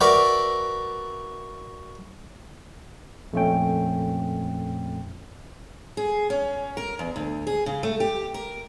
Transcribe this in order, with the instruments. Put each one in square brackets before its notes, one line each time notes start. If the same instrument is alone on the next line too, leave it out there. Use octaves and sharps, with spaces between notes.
[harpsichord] F#4 A#4 B4 D5 E5
[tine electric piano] F2 A#2 A3 C#4 G5
[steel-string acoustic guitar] G#4
C#4
A#4
E2
D2
G#4
C#3
A3
G4
A#4